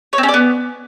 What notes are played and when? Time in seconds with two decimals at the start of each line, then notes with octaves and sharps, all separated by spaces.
0.13 C#5
0.18 C4
0.23 C#4
0.28 D5
0.34 B3